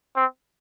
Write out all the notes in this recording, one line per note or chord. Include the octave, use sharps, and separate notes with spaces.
C4